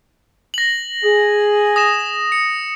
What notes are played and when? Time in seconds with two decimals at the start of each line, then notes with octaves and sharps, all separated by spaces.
0.54 A#6 F#7
1.04 G#4
1.76 D#6 A#6 E7
2.32 C#7